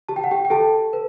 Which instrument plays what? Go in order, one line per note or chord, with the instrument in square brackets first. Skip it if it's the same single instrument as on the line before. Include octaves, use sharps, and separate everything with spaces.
[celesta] G4 A5
G5
F#5
G4 G5
G5
G4 A4 A5
B4